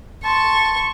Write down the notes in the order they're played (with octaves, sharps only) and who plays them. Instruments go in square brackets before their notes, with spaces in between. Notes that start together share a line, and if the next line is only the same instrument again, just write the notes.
[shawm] A5 [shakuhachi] C6 [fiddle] C#6